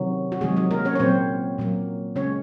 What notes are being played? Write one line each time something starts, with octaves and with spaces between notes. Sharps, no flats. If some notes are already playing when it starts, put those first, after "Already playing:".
Already playing: C3 D#3 F#3
F#4
C3 D#3 F#3 G#3 G#4
F#3 F#4
A#3 A#4
C#4 C#5
C#5
A#2 F#3 A#3 C4 C5
A#2 F#3 A#3
C#3 G#3 C#4 C#5